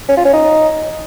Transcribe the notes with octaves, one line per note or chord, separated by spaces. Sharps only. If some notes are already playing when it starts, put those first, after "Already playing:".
C#4
F4
C#4
D#4